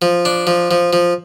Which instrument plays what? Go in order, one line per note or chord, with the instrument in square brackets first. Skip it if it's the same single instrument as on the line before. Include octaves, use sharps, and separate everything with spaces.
[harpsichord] F3
D4
F3
F3
F3